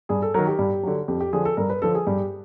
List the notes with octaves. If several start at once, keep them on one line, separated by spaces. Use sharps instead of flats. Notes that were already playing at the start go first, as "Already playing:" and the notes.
G2 G#4
A4
D#3 F#3 A#4
G4
G2
D3 F#3
F2 G4
G4
D3 F3 G#4
A4
G2 A#4
B4
D3 F3 A4
G#4
G2 G4